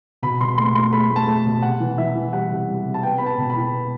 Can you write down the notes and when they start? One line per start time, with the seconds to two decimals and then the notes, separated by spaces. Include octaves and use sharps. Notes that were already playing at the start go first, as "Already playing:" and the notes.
0.22 B2 B5
0.41 B2 C6
0.58 A3 C6
0.75 A3 C6
0.93 A3 B5
1.10 A3
1.16 A5
1.28 A3
1.45 B2
1.62 C3 F#5
1.80 E3
1.98 E3 E5
2.15 E3
2.33 G3 F#5
2.50 C3
2.68 G3
2.86 C3
2.94 A5
3.03 B3 G5
3.18 B3 B5
3.26 A5
3.38 B2
3.50 B5
3.56 E4
3.74 B3